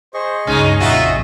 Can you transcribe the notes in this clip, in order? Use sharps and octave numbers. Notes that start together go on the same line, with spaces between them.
G#4 C5 D#5 C#6
C#2 G2 G#3 C#4 D#4
A#1 F2 C#3 D#4 F4 F#4 E5